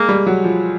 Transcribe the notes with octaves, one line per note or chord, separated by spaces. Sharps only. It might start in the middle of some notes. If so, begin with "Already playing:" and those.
Already playing: G#3 A#3
G3
F#3
F3